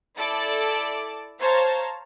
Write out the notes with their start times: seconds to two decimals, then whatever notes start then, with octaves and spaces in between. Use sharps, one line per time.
0.16 E4 A4 D5 A5 D6
1.39 C5 C#5 F5 A5 A#5